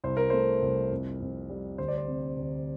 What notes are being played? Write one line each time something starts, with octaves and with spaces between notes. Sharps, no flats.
C2 C5
A#4
A3 C5
C2
F2
F2
G3
D2 C5
D5
C5
C3
D2